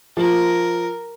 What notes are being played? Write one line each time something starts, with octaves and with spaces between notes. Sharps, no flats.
F3 A#4